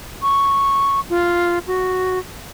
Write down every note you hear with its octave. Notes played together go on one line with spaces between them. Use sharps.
C#6
F4
F#4